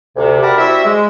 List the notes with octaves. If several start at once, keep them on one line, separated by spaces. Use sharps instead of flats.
D2 C3
D4 F#4 G4 A#4 A5 B5
G3 C4 E4 F#4 E5
G#3